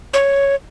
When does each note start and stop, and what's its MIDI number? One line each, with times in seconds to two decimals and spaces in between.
0.14 0.55 73